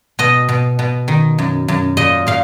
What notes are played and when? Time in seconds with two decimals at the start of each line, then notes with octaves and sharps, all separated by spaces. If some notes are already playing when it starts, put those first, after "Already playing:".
0.19 B2 D#5
0.49 B2
0.79 B2
1.08 D#3
1.38 F#2
1.68 F#2
1.97 A#2 D#5
2.27 A#2 F5